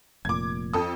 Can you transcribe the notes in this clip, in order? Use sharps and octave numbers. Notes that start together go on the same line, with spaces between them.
F1 A#2 D6 G#6
F2 A4 D#6